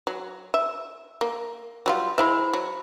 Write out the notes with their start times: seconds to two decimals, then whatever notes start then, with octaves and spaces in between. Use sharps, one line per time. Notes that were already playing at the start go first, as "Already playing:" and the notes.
0.07 F#3
0.54 E5
1.21 A#3
1.86 F#3 G3 F4
2.18 G#3 E4 C5 E5 B5
2.53 F#3